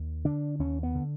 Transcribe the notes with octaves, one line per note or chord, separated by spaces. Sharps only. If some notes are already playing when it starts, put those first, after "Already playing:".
Already playing: D#2
D3 D4
D#2 C#4
B3
D3